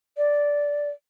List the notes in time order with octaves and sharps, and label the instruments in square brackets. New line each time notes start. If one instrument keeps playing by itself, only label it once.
[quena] D5